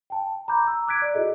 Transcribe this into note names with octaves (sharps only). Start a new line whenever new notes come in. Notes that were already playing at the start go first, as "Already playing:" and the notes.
G5 A5
A#5 B5 D6 G6
A#5 E6
D6 E6 F#6 G#6 B6 D7
D5
E4 F#4 G#4 A4 D#5